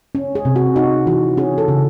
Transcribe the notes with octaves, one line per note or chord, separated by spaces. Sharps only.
C#4
G#4
C3
F#4
D#4 F#4
E3 F#4
C#4 G#4
A4
C#3